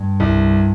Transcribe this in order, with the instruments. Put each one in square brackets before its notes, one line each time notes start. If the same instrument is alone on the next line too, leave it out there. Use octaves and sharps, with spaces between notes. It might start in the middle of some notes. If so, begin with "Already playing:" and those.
Already playing: [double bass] G2
[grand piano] C2